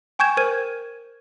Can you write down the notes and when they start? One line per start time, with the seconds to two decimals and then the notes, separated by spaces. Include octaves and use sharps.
0.19 G5 G#5 C#6 G6 G#6 E7
0.37 A#4 C5 F6 G#6 D#7